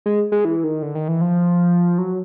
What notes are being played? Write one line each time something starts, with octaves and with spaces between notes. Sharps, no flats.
G#3
G#3
E3
D#3
D3
D#3
E3
F3
F#3